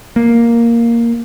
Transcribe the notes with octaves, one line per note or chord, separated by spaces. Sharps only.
A#3